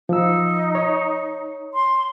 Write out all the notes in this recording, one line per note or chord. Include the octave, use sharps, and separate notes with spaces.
F3 D#4 E6
C#5
C6